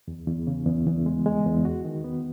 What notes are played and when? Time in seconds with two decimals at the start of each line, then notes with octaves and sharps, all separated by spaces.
0.08 E2
0.27 E2
0.47 C#3
0.67 E2
0.87 E2
1.06 G#3
1.26 G#3
1.46 E2
1.65 F#4
1.85 D#3
2.04 B3